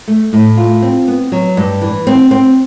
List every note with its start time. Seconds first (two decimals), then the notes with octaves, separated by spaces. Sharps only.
0.08 A3
0.33 A2
0.57 F4
0.82 C4
1.08 B3
1.32 F#3
1.57 G2
1.82 E3
2.07 C4
2.31 C4